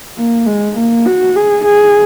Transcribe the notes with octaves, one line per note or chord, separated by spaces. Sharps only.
A#3
G#3
A#3
F#4
G#4
G#4